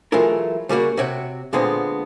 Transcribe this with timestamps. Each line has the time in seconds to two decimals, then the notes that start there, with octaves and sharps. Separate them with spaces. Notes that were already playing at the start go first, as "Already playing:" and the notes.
0.12 E3 F#3 G#3 A3 F4 A#4
0.69 C#3 G3 A#3 F#4
0.97 C3 F#4 C#5 G5
1.53 A#2 D3 G#3 B3 C4